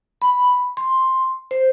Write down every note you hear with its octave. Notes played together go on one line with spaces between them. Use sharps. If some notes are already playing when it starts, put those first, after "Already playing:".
B5
C6
C5